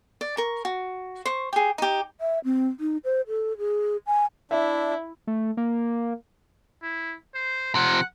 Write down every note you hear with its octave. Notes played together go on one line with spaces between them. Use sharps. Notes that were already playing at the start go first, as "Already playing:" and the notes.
D5
A#4 C#6
F#4
C5 C#6
G4 G#4
D#4 G4
E5
C4
D#4
C5
A4
G#4
G#5
D4 E4 E5
A3
A#3
E4
C5
C3 F3 F#5